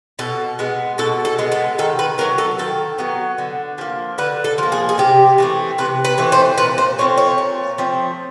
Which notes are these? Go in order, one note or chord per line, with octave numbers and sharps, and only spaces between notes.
B2 A4
G#3 B3
B2 A4
A4
G#3 B3
A4
D#3 A4
B4
F#3 B3 A#4
A4
D#3 A4
F#3 B3
D3
F3 A#3
D3 B4
A4
F3 A#3
G#4
G#4
C3 G4
E3 A3 C4
C3 B4
B4
E3 A3 C4
C5
A#2 B4
C5
F3 A3 C4 C#5
C#5
A#2
F3 A3 C4